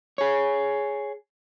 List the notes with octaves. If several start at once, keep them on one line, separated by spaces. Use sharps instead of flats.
G#4 C#5